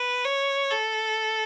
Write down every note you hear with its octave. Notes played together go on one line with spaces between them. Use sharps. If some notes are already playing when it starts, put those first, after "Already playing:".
Already playing: B4
C#5
A4